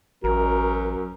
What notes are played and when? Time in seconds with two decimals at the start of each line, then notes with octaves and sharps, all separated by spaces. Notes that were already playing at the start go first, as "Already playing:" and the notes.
0.24 A1 F#2 F#4 A#4